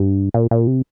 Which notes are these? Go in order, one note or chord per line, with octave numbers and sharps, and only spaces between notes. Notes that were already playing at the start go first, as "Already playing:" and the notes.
Already playing: G2
A#2
A#2
C3